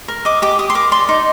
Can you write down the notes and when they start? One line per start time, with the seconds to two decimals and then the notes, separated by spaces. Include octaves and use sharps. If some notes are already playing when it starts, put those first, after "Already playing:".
0.08 A#4
0.25 D#5 D6
0.42 G4 D6
0.59 G4 D#6
0.70 C6
0.75 A#4 D6
0.91 D5 C6
1.09 D#4